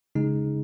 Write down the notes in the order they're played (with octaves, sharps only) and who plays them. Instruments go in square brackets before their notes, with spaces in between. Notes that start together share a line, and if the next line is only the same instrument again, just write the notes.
[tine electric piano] C#3 G#3 D#4 G#4